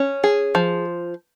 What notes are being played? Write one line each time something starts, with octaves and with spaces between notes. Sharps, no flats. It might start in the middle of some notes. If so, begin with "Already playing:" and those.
Already playing: C#4
G#4
F3